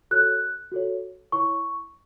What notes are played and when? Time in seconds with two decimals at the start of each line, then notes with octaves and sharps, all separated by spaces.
0.11 F#4 A4 C#5 F#6
0.72 F#4 A4 C#5
1.32 E4 C#5 C#6